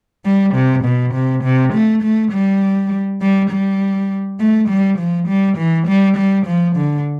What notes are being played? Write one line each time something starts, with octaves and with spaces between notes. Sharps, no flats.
G3
C3
B2
C3
C3
A3
A3
G3
G3
G3
A3
G3
F3
G3
E3
G3
G3
F3
D3